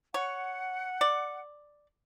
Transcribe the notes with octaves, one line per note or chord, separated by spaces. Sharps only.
C#5 F#5
D5